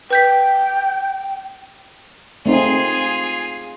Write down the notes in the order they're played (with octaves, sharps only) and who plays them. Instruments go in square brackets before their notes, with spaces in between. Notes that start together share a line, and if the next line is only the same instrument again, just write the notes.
[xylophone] B4 G6 B6 [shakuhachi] G5
[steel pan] A3 C4 D#4 [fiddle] F4 G#4